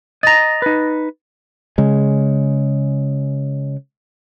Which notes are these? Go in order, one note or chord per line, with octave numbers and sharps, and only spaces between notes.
D#5 A#5 A6 A#6
D#4 B4
C#3 G#3